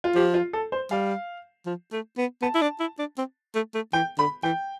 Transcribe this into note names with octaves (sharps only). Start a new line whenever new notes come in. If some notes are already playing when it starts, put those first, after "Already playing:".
F4
F3 G4
F4
A4
C5
G3 F5
F3
A3
B3
B3 A5
E4
D4
E4
D4
C4
A3
A3
E3 G5
D3 B5
E3 G5